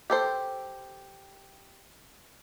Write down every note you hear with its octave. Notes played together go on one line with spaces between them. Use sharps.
G4 A4 C5